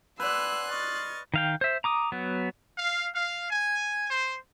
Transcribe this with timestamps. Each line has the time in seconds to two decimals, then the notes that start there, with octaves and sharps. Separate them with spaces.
0.20 B4 D5 F#5 G#5 C6 E6 F#6
0.71 D#5 C#6 F6 A6
1.34 D#3 F5 G5
1.61 C5 E5
1.84 A#5 D6 D#6
2.12 F#3 B3
2.77 F5
3.12 F5
3.50 G#5
4.09 C5